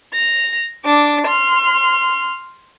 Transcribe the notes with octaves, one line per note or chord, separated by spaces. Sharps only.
A#6 F7
D4 D6
C6 F6